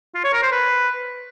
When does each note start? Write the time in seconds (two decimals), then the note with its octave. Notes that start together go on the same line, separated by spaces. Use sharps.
0.15 F4
0.24 C#5
0.33 A#4
0.43 C5
0.52 B4